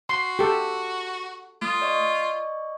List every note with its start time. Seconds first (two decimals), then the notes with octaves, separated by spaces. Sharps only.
0.09 F#4 C6
0.39 G4 A4
1.62 A3 F4 D#6
1.82 D5 D#5 C#6